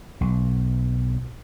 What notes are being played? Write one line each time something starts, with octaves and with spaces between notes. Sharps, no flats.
B1